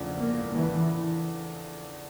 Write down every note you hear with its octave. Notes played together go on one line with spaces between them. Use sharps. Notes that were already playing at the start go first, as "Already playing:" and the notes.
Already playing: E2 C#3 F3 A3 D4
A#3
E3